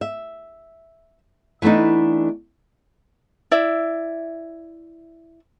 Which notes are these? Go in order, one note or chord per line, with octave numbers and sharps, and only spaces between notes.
E5
E3 A3 B3 D4 D#4
E4 D5 E5